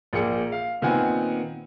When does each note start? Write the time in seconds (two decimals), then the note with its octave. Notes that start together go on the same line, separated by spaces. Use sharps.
0.13 A#1 A#3 G#4 C#7
0.52 F5
0.82 A#2 D#3 B3 C4 F#5 G#5